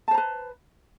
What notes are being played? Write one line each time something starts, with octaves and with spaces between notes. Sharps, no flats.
B4 C5 A5 A#5